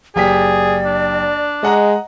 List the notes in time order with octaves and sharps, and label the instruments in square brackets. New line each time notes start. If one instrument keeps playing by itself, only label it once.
[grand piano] F#1 G4 B6 [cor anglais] G#4 [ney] D5
[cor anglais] D4
[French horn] G#3 [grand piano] D#5 F#5 A#5